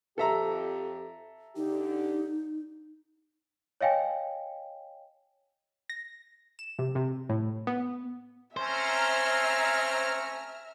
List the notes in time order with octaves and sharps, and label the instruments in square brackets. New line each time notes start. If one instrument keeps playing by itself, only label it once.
[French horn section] F2 G4 [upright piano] A4 E5 A#5
[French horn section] D3 G4 [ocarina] D#4
[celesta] C#5 D#5 F5 G5 G#5
[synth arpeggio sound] A#6
E7
C3
C3
A2
B3
[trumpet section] A3 C4 C#4 [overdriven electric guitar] C5 [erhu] E5 [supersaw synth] A#5 F6